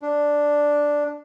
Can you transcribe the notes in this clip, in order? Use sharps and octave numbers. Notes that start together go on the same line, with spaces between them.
D4